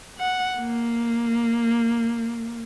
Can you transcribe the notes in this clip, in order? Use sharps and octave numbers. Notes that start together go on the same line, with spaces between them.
F#5
A#3